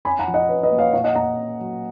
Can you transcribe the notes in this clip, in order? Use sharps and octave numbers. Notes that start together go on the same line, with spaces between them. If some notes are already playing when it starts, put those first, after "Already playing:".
C#4 G#5 B5
F#5 A#5
F3
D#5 F#5
C#4 B4
B4 D#5
A#3
C#5 F5
A#2 C#5 F5
D#5 F#5
A#2 F#5 A#5
C#4
F#3